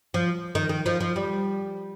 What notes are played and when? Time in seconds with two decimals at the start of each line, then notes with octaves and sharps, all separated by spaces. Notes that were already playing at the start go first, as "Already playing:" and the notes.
0.14 F3
0.55 D#3
0.69 D#3
0.86 F3
1.00 F3
1.16 G3